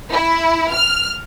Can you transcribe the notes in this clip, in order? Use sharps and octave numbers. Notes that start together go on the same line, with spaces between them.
E4
F6